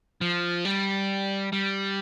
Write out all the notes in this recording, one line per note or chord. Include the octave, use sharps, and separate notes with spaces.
F3
G3
G3